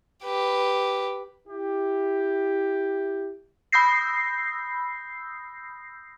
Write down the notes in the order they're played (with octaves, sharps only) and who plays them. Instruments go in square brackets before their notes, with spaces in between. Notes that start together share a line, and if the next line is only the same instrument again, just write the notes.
[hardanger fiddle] G4 B4
[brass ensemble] E4 G4
[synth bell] B5 D#6 E6 G6 A#6 C7